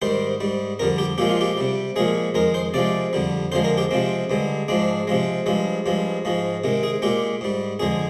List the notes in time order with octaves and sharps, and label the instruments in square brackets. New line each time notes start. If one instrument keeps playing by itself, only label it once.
[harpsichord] G#2 D#3 G3 C5
G#2 G3
F2 D3 G3 A#4
G4
A#2 F3 G#3 G4
F4
G4
C3 G3
A#2 F3 G#3 G#4
F2 D#3 G#3 A#4
C5
C3 F3 G#3 D5
F2 D3 G3
F2 D3 F3 G#3 C5
A#4
G4
C3 F3 G#3 C4
G2 D3 G#3
G#2 F3 G#3 D4
C3 F3 G#3
G2 F3 G#3
G2 F3 G#3
G#2 F3 G#3
C3 D#3 G#3
G#4
A#2 G#3 G4
G#2 G3
F2 D3 G#3 G#4